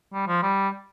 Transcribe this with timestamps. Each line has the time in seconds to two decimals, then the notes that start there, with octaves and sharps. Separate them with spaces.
0.13 G3
0.27 F3
0.42 G3